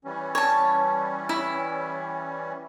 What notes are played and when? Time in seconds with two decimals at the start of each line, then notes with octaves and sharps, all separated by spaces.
0.05 E3 G3 C#4
0.35 C#5 A5
1.29 E4